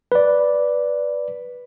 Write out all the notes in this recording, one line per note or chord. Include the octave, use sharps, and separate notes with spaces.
B4 D5